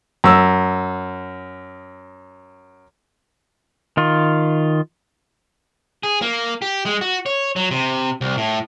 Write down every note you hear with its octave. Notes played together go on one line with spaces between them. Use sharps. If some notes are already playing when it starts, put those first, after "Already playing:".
F#2 E6
D#3 F4
G#4
A#3
G4
G#3
F#4
C#5
F#3
C3
C2
A2